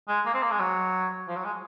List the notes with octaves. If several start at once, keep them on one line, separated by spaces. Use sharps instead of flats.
G#3
A#3
C4
A#3
G#3
F#3
F3
F#3
G#3